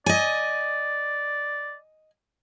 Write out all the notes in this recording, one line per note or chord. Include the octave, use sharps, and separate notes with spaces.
D5 D#5 G#5